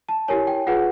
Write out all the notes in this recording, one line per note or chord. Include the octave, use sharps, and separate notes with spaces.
A5
E4 G4 A#4 C#5 G#5
G5
F4 G#4 B4 F#5